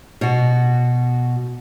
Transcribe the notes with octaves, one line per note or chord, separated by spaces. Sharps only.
B2 F#4